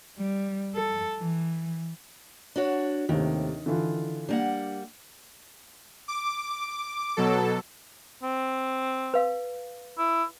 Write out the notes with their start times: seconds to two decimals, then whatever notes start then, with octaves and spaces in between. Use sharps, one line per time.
0.18 G3
0.76 A4
1.18 E3
2.56 D4 F#4 C#5
3.09 D#2 A2 C3 D#3
3.66 D3 E3 F4
4.29 G3 A#3 D4 F#5
6.08 D6
7.17 B2 F#3 A4
8.23 C4
9.14 B4 F5
9.98 E4